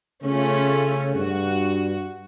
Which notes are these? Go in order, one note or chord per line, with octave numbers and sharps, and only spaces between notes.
C#3 A3 C#4 F4
G2 F#4